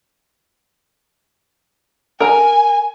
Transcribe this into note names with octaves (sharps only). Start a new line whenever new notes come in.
A#4 G#5 A#5